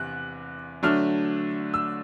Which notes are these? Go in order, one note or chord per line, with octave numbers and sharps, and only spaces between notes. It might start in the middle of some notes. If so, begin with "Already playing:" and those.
Already playing: E2 C3 F#6
D3 F#3 A3 D4 F6
E6